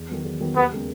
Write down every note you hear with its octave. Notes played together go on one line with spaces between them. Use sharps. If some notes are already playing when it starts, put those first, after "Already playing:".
Already playing: E2
D#3 F#3 B3
E2
D#3 F#3 B3
D#2 B3
C#3 G#3 B3